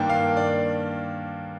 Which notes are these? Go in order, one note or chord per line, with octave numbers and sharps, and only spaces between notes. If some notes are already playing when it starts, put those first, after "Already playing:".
Already playing: G2 D#3 A#3 D4 G5
F5
D5